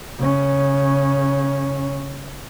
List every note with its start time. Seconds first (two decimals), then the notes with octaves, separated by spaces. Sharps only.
0.18 C#3 C#4